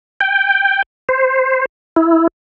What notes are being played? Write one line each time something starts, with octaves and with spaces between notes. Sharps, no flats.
G5
C5
E4